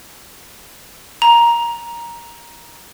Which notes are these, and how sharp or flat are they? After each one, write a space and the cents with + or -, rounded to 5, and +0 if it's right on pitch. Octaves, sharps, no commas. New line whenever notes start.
A#5 +10